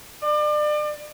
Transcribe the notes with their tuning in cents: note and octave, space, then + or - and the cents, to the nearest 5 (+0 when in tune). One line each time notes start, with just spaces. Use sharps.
D5 +35